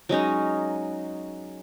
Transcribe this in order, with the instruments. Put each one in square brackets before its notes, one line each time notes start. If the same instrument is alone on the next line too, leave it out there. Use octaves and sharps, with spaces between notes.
[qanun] F#3 G#3 C#4 D#4